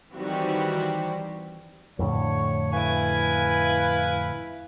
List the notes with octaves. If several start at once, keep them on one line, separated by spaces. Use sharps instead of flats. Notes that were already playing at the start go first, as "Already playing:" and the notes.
D#3 E3 G3 C4 F#4 G4
F2 A2 D3 C#5
E4 B4 F5 G#5